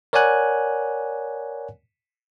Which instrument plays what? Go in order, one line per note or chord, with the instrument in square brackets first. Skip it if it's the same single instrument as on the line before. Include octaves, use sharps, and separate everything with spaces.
[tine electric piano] A#4 C#5 D5 F#5 G#5 F#6